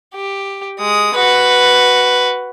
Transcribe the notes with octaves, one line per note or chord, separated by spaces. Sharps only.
G4
G#3 D#6
F#4 B4